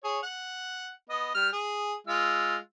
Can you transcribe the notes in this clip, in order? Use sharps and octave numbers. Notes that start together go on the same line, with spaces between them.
G#4 C#5
F#5
B3 D#5
G3 F6
G#4
G#3 F4 E6